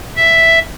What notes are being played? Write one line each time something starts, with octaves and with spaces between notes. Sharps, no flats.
E5